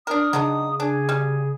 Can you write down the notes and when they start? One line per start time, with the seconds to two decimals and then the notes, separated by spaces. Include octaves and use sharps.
0.07 D4 A#4 D#6
0.33 C#3 F#3 D4 D#4
0.80 D4 G#4
1.09 G3